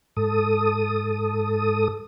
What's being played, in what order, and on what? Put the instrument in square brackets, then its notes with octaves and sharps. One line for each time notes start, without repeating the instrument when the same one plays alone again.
[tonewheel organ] G#2 A4 D#6